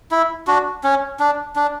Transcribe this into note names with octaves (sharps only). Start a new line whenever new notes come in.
E4
D4 F#4
C#4
D4
D4